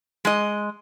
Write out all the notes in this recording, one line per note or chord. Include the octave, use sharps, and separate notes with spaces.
G#3 D#5